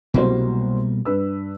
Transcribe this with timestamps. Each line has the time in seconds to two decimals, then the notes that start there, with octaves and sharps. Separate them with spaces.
0.14 C2 B2 F#3 G3 A#3 C5
1.05 G2 B4 E6